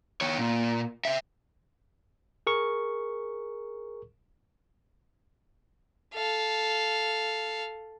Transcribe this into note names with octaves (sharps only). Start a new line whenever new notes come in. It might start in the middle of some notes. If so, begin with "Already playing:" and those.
D#3 C#5
A#2
C5 E5
G#4 A#4 C#6
A4 F5